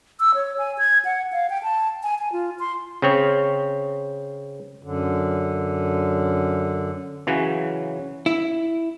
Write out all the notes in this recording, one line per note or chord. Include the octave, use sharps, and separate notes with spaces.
E6
C#5
G#5
G#6
F#5
F5
G5
A5
G#5
G#5
F4
C6
C#3 C4 C#5
F#2 D3
C#3 E3 F#3 C#4 F#4
E4